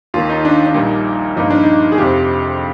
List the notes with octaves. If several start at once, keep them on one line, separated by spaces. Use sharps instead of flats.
D#2 D#3 A#3 F4
D#4
D4
D4
A#1 A#2 G3 A#3 D#4
G2 F3 A#3 D#4
D4
D#4
G#4
F2 C3 F3 G4